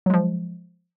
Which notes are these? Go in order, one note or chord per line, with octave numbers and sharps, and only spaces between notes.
F3 F#3 G#3